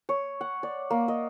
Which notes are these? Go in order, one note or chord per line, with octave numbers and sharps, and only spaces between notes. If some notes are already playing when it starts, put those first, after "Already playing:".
C#5
F#5
D5
A#3
D#5